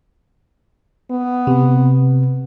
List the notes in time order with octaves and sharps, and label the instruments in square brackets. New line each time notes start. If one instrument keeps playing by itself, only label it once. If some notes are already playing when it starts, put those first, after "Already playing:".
[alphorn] B3
[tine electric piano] C3